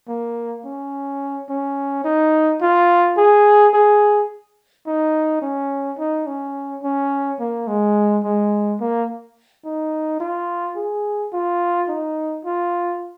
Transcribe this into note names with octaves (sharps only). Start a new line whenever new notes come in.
A#3
C#4
C#4
D#4
F4
G#4
G#4
D#4
C#4
D#4
C#4
C#4
A#3
G#3
G#3
A#3
D#4
F4
G#4
F4
D#4
F4